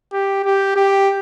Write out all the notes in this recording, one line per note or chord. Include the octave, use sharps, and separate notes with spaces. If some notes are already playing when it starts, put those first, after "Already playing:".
G4
G4
G4